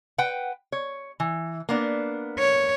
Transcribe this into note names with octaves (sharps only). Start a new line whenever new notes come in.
B4 F#5 G5
C#5
E3
A#3 B3 D4
C#5